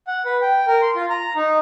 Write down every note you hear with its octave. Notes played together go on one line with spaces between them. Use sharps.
F#5
B4
G5
A#4
C6
F4
A#5
D#4